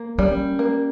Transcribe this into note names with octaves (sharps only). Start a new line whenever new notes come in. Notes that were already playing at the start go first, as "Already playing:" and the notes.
Already playing: A#3
G3 C#4
A#3